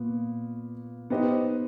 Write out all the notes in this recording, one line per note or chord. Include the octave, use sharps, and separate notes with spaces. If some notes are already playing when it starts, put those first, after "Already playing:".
Already playing: A#2 B3
B3 D#4 G4 C5 D#5